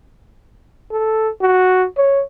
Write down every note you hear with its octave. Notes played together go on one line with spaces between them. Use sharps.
A4
F#4
C#5